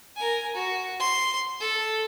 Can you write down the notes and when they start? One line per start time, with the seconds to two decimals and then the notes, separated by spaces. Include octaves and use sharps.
0.16 A#4 G#5
0.55 F#4
1.00 C6
1.60 A4